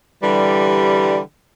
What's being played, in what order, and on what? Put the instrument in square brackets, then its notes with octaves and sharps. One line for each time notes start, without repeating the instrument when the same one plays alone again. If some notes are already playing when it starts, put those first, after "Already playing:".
[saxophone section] D3 E3 G3